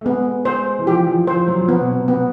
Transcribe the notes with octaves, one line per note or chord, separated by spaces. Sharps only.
A3
G#3 B3
G#3 C5
E3
F3 G4
F3
F3 C5
F#3
F3
F#3 B3
B2
C3
C3 B3